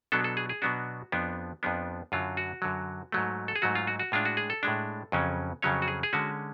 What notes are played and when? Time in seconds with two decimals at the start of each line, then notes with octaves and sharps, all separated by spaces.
0.12 B2 F#3 B3 D4 A4
0.24 A4
0.37 G#4
0.49 G#4
0.62 B2 F#3 B3 D4 F#4
1.12 F2 F3 B3 D4
1.63 F2 F3 B3 D4
2.12 F#2 D3 F#3 F4
2.37 F#4
2.62 F#2 D3 F#3
3.12 G#2 F#3 A3
3.48 A4
3.55 G#4
3.62 G#2 F#3 A3 F#4
3.75 F4
3.87 F#4
3.99 F#4
4.12 A2 G#3 D4 F4
4.25 F#4
4.37 G#4
4.50 A4
4.63 A2 G#3 D4
5.12 F2 C#3 F#3 C#4
5.62 F2 C#3 F#3 C#4 C#5
5.82 F#4
5.88 G#4
6.03 G#4
6.13 D3 G#3 C#4 F#4